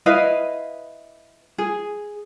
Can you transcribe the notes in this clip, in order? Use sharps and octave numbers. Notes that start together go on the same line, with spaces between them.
E4 B4 D#5 F5
G#4